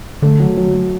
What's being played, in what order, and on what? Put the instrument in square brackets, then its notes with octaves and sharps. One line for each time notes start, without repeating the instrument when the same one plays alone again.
[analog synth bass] D3 [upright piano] A3
[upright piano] F#3
F#3
F#3